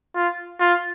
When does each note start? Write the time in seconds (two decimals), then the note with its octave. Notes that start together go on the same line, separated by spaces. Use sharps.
0.15 F4
0.60 F4